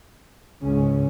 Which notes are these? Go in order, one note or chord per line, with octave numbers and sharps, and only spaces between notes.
C#2 G#2 C#3 C#4